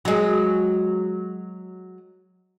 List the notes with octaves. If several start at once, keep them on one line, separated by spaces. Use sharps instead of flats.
F#3 G#3